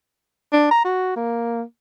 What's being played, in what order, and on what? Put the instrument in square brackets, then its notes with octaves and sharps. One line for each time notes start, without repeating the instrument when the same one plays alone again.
[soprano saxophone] D4
A#5
F#4
A#3